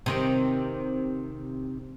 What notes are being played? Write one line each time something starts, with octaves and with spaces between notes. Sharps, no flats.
C3 D#3 C4